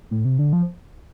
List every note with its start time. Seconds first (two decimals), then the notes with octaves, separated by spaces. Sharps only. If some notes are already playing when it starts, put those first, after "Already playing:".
0.11 A2
0.25 C3
0.39 D3
0.53 F3